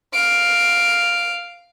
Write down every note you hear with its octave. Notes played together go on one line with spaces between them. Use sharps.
F5 D7